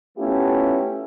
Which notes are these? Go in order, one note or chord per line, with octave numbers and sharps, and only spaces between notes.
A3 B3 C#4 E4 F4 G4